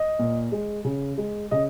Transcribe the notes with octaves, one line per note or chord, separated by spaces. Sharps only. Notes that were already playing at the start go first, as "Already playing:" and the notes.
Already playing: D#5
A#2
G#3
C#3
G#3
C#3 D#5